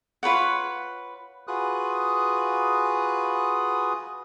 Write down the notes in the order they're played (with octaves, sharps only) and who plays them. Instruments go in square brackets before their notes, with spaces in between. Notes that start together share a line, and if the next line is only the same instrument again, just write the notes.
[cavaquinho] F4 B4 C#5 F#5
[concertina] F4 F#4 G#4 B4 D#6 F#6